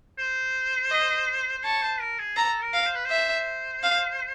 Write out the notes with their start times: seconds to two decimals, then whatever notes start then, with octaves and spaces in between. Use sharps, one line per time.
0.19 C5
0.91 D#5
1.58 C5
1.64 C#5 A5
1.82 C5
2.01 A#4
2.19 G#4
2.37 A4 A#5
2.61 A#4
2.74 F5
2.86 C5
2.95 B4
3.05 C5
3.10 E5
3.83 F5